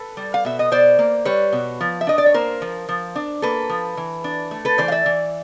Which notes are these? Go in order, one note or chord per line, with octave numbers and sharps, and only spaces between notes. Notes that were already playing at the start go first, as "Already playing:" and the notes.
Already playing: A4 B4
G3
F5
B2 E5
D#5
B2 C5 D5
A#3
G3 B4 C#5
B2
F3
E5
D4 D#5
D5
C#5
A#3 A#4 C5
F3
F3
D4
A#3 A4 B4
F3
E3
D4
A3
A4 B4
E3 C5 D5
F5
D5 E5
E3